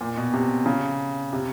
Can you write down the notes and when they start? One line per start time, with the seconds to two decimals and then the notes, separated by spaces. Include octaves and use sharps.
0.01 A#2
0.17 B2
0.33 C3
0.66 C#3
1.33 C3